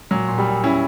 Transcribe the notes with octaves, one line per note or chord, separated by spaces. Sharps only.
A#2 F#3
A#2
G3
A#2
A#2 C#4 E4